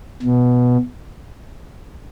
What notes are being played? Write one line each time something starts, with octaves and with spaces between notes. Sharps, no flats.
B2